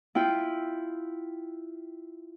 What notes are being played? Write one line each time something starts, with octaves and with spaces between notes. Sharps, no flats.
E4 F4 G5